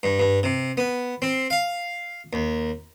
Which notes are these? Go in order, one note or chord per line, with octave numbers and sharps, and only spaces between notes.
G2
G2
C3
B3
C4
F5
D#2